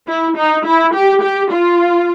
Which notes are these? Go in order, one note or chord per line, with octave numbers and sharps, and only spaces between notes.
E4
D#4
E4
G4
G4
F4